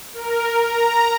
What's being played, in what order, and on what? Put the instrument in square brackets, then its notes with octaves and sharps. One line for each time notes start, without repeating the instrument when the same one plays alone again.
[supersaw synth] A#4
A#5